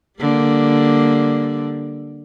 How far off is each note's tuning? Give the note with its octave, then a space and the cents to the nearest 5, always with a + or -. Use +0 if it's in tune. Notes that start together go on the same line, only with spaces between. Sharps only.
D3 +0 G3 +0 A#3 +0